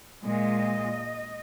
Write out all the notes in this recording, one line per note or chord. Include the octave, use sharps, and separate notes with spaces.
A#2 G#3 D#5